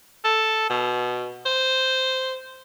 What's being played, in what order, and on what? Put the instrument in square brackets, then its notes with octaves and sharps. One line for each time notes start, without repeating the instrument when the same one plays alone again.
[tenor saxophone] A4
B2
C5